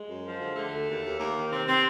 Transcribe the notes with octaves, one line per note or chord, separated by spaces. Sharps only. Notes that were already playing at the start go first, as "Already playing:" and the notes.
Already playing: G#3
F#2
F3
D3
D3 A3
D2
D#2
D#2
D#2 A#3
D#3
C3 C4
C3 C4